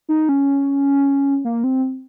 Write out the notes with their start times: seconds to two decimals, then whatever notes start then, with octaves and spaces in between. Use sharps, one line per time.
0.09 D#4
0.29 C#4
1.45 A#3
1.64 C4